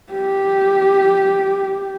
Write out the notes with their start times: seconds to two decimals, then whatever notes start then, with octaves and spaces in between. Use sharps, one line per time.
0.12 G4